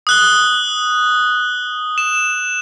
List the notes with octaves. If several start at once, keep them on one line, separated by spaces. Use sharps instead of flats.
D#6 F#6 G7
E7